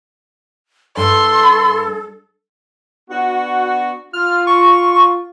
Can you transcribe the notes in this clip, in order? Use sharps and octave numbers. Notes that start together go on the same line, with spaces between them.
G2 A4 C6
B3 D4 F#4
F4 F6
C#6